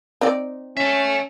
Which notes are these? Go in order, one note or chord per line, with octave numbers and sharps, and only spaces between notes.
C4 D#4 D5
C#4 E5 A5